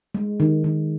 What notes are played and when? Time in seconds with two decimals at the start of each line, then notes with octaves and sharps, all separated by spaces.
0.15 G#3
0.40 D#3
0.64 D#3